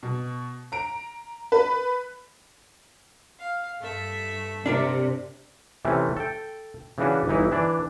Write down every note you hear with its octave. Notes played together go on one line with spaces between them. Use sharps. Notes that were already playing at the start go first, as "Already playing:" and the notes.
B2
A#5 D7
B4
F5
G2 A3 E5
C3 D4 A#4 D5
C3 E3 A3 C4 C#4
A4 G5
C#3 E3 C#4 D4 F#4 B4
G1 E3 D#4 E4
E3 D4 D5